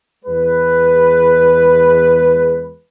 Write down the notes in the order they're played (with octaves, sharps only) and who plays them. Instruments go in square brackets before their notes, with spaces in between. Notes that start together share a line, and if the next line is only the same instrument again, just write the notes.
[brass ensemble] E2 G#3 B4